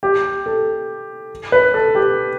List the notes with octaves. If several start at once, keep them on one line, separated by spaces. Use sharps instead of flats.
G4
A4
B4
A4
G4